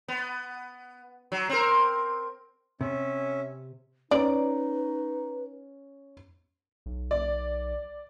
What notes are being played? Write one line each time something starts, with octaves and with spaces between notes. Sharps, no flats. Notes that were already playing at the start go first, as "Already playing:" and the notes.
B3
F#3
C4 A#4
C3 C#4 E5
C#4 D#4 B4 D5
B1
D5